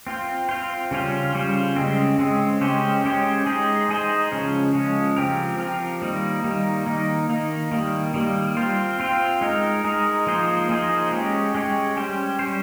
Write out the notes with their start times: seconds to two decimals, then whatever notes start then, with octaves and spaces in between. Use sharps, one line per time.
0.07 C4 F4 C5
0.49 C4 F4 C5
0.91 C#3 G3 C#4 F4 C5
1.34 C#3 G3 C#4 F4 C5
1.76 C#3 G#3 C4
2.18 C#3 G#3 C4
2.61 G#3 C#4 G4 C5
3.04 G#3 C#4 G4 C5
3.46 G#3 D#4 G#4 C5
3.89 G#3 D#4 G#4 C5
4.31 C#3 F3 G#3 C#4
4.74 C#3 F3 G#3 C#4
5.16 F3 C4 G4 A#4
5.58 F3 C4 G4 A#4
6.02 D#3 G3 A#3 D#4
6.44 D#3 G3 A#3 D#4
6.86 D#3 A#3 D#4
7.29 D#3 A#3 D#4
7.72 D#3 G3 A#3
8.14 D#3 G3 A#3
8.57 C4 F4 C5
9.00 C4 F4 C5
9.41 G#3 D#4 A#4
9.84 G#3 D#4 A#4
10.27 F3 A#3 D#4 G#4 C5
10.70 F3 A#3 D#4 G#4 C5
11.12 G#3 C#4 G4 C#5
11.55 G#3 C#4 G4 C#5
11.97 G3 C#4 G4 C5
12.39 G3 C#4 G4 C5